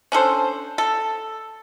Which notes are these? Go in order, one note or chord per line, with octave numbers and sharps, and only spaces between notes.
C#4 D4 A4 C5
A4